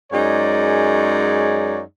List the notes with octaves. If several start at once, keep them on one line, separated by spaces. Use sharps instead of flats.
F#2 G#3 D#4 G#4 C#5 D5